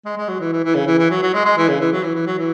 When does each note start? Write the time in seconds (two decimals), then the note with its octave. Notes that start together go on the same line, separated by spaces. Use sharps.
0.05 G#3
0.17 G#3
0.28 F#3
0.41 E3
0.53 E3
0.64 E3
0.75 C#3
0.87 E3
0.99 E3
1.11 F#3
1.22 F#3
1.34 G#3
1.45 G#3
1.57 E3
1.69 C#3
1.81 E3
1.92 F#3
2.03 E3
2.15 E3
2.26 F#3
2.38 E3